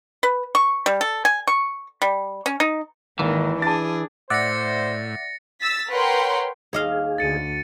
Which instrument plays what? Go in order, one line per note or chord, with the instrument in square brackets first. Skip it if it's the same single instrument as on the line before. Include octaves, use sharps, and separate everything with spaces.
[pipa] B4
C#6
G3
A4
G#5
C#6
G3
C#4
D#4
[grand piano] G#1 A#3 [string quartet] D#3 [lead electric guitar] E3
[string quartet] D4 G#4 [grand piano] A5 A6
[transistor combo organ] A2 [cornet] C5 [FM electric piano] D5 E5 F#5 [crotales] A6 A#6 C#7
[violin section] E6 A6 B6
A#4 B4 C#5 F#5 G5 C6
[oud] D#2 D#5 F5 [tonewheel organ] G#4
[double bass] D2 D3 [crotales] A6 C#7 D#7